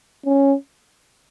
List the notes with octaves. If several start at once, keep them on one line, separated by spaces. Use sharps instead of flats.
C#4